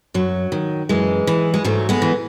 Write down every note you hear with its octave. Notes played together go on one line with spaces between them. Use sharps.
F#2 F#3
D#3
F#2 E3 G#3
E3
G#3
G#2 F#3 A3
G#3 B3
E3